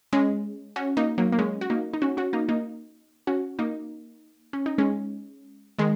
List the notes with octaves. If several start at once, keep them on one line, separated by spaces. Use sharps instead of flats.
G#3 C#4
C#4 F#4
A#3 D#4
F#3 A#3
A#3
G#3 C#4
F#4
A#3 D#4
D#4
C#4 F#4
C#4 F#4
A#3 D#4
A#3 D#4
C#4 F#4
A#3 D#4
C#4
D#4
G#3 C#4
D#3 G#3